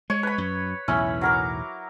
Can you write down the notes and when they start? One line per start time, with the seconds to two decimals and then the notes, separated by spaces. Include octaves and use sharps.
0.10 G#3 C#5
0.23 B4 B5
0.38 F#2
0.88 B1 E2 A2 C#4 E4 B5
1.21 F#3 A#4 D6